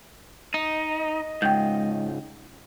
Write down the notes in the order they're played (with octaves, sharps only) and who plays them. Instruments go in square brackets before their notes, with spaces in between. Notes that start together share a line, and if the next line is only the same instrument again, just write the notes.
[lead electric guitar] D#4 [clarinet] D#5
[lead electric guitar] C#2 G#2 [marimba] G5 G6